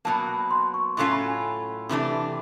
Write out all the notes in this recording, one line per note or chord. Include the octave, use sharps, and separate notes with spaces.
B2 F#3 A#3 A5
C6
C#6
A2 F#3 A3 C#4 F4 C6
B5
G#5
C3 E3 A3 D4